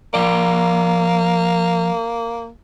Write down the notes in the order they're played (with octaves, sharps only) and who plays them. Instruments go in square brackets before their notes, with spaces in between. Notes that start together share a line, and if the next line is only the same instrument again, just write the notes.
[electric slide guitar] F3 D5 [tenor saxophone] A#3